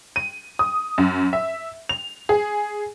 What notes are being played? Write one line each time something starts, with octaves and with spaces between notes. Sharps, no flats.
D#7
D#6
F#2
E5
F7
G#4